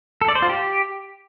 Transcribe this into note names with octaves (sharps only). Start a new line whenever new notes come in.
A4
D5
C5
F4
G4